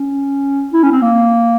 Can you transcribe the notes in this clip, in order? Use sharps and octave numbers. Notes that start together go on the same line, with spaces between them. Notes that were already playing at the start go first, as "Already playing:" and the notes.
Already playing: C#4
E4
C#4
C4
A#3